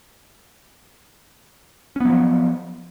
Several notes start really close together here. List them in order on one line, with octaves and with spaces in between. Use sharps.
C#4 B3 F#3 F3